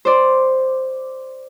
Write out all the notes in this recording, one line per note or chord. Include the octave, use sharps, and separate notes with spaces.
C5 D5